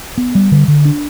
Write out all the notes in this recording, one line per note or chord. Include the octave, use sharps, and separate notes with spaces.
B3
G3
D3
D3
D4